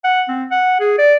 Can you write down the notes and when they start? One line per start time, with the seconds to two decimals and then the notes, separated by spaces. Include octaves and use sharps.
0.04 F#5
0.28 C4
0.51 F#5
0.80 G#4
0.98 D5